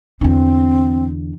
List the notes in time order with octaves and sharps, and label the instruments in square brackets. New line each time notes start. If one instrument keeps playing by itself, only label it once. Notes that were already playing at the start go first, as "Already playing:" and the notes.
[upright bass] E2 D3 [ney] C4